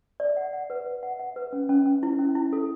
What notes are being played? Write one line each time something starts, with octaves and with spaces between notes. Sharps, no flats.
D5
F#5
F#5
B4
B4
F#5
F#5
B4
C#4
C#4
C#4
E4
C#4
E4
A4